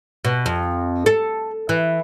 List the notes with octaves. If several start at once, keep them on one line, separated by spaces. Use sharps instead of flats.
B2
F2
A4
E3